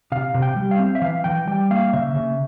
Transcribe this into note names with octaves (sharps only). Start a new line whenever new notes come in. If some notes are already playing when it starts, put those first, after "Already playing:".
C3 F5
C3
G5
G3
F5
C4
E5
E3 F5
E3 G5
G3 G5
A#3 F5
C#3 E5
C#3